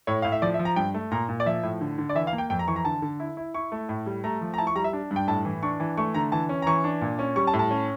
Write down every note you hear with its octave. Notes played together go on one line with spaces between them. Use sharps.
A2 C#5
A2 F5
E5
F3 D5
E5
F3
A#5
G2 G5
A3
A#2 A#5
A#2
D5
F3 E5
A2
D3
D3
D5
E3 E5
F5
A#3
G5
F2 G5
A#5
E3 C#6
A#5
D3 A5
D3
E4
E4
E4 C#6
A3
A2
G3
A3 A#5
F3
A#5
E4 A5
C#6
G3 A#5
E5
D4
G2
G5
A2 A5
E3
D4 C#6
E3
A3 C#6
D3 A#5
E3 A5
C#4
A#5
E3 C#6
D4
A#2
C#4
G3 C#6
A5
A2
A5
C#4